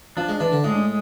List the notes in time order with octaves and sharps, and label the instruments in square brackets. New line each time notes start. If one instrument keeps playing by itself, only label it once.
[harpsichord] F3 [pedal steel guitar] D4
[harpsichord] G#3
[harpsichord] E3 [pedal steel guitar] D4
[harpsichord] D3
[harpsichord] A2 [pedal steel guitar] G#3